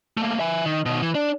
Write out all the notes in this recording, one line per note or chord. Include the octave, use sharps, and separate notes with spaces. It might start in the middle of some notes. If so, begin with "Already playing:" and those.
A3 A#3
E5 G#5
D#3
B2 D#3
E3
D4